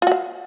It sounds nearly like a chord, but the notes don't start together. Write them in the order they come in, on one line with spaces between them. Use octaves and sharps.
F4 F#4 F5